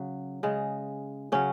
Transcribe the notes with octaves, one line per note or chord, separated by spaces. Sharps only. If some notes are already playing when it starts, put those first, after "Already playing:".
Already playing: C#3 F#3
C#3 G#3
C#3 F#3 C#4